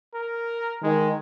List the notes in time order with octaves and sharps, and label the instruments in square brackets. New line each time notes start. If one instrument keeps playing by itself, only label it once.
[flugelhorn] A#4
[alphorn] D#3 [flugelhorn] G#3